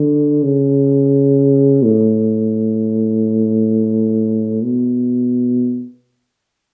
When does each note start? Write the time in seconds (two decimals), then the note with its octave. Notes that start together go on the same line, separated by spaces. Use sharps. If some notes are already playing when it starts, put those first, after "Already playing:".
Already playing: D3
0.43 C#3
1.83 A2
4.63 B2